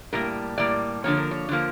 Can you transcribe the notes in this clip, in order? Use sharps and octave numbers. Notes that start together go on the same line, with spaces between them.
A2 G3 A#3 A#4
A2 G3 A#3 D5
D3 F3 A#3 C#5
A#4
C#5
D3 F3 A#3